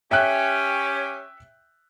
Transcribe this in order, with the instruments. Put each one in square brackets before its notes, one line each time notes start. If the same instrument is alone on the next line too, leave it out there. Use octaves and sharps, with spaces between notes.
[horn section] C#4 G4 [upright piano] E5 G5 F#6